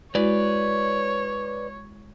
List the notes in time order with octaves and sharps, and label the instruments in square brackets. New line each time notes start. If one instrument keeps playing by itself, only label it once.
[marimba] G#3 E4 F#4 [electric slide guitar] B4 D5 [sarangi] C#5